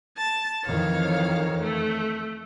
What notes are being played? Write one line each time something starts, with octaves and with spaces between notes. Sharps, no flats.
A5
F2 D#3 E3 C#5 F5
A3